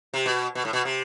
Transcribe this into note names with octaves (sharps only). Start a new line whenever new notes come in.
C3
B2
B2
A2
B2
C3